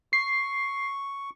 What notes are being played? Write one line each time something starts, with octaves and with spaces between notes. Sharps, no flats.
C#6 C7